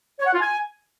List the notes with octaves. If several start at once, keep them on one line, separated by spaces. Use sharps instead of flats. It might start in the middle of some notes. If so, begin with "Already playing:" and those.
C#5
F#5
F4
G#5